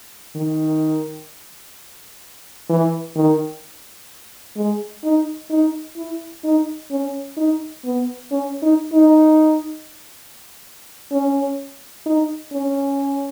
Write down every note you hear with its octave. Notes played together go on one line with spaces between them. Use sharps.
D#3
E3
D#3
G#3
D#4
D#4
E4
D#4
C#4
D#4
B3
C#4
D#4
D#4
C#4
D#4
C#4